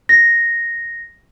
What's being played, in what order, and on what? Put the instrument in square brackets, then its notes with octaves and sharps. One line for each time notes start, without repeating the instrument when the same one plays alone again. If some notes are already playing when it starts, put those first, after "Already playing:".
[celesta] A#6